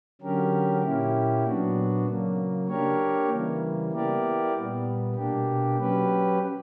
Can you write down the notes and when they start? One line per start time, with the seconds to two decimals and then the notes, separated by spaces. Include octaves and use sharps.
0.21 D3 F#3 C#4 G4 A#4
0.82 A#2 A#3 C#4 E4 G4
1.44 A#2 F#3 B3 D4 F#4
2.06 C#3 F#3 A#3
2.68 A#3 D4 G4 A#4 C#5
3.29 C#3 E3 G3 A#3
3.92 B3 E4 G4 A#4 D5
4.54 A#2 G3 B3
5.15 B2 A#3 D4 G4
5.77 F#3 C#4 G4 B4